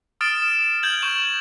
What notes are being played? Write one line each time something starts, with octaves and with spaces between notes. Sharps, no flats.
D#6 F6 A6 D7 E7
E7
F6 G6 G#6 F#7
C#6 E7
F#7